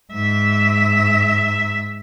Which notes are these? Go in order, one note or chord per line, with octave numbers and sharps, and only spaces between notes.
G#2 E5